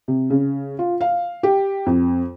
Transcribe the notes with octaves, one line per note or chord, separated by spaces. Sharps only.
C3
C#3
F4
F5
G4
F2